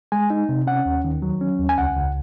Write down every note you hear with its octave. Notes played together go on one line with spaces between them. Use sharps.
G#3 G#5
D#4
C3
C#4 F#5
D#2
D#3
F#3
C#4
D#2
G#5
C#2 F#5
C#2